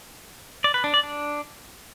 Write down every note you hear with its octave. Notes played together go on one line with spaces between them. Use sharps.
D5
B4
D4
D5
D4